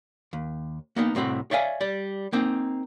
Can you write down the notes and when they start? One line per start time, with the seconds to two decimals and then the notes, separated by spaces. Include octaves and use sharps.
0.33 D#2
0.96 A#3 B3 D#4
1.15 C2 A2 C4 F#4
1.51 C#5 D5 E5 F5 G#5
1.81 G3 D5
2.33 A#3 C4 D#4